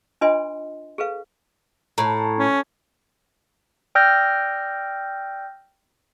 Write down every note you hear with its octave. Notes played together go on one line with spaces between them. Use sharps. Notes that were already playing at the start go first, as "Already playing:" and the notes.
D4 F4 B4 D#5 G#5 C6
G#4 A4 B4 F5
A2 A#5
C#4
D5 G5 E6 F6 G6 A#6